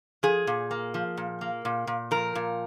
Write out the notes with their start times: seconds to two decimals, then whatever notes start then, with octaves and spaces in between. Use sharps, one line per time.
0.23 F3 G#4
0.47 A#2
0.71 A#3
0.94 F3
1.17 A#2
1.41 A#3
1.65 A#2
1.87 A#2
2.11 F3 A#4
2.35 A#2